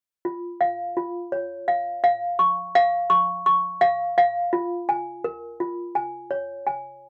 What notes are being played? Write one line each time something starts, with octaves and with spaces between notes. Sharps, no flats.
F4
F5
F4
C#5
F5
F5
C#6
F5
C#6
C#6
F5
F5
F4
G#5
A#4
F4
G#5
C#5
G#5